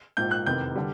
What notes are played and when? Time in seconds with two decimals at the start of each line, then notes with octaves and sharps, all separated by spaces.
0.17 A#1 G#2 F3 G6
0.31 F#6
0.46 F1 E2 C3 D#3 G6
0.75 D3 G3